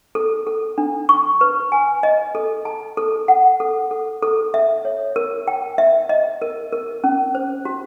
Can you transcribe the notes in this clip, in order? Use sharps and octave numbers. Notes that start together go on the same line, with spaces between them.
A4
A4
D4
C#6
B4
G#5
D#5
A4
A5
A4
F#5
A4
A4
A4
E5
C#5
A#4
G5
E5
D#5
A#4
A#4
C#4
C5
F#4